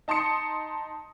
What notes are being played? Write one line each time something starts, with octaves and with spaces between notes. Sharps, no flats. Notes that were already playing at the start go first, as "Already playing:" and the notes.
D#4 A5 C6 D#6 C#7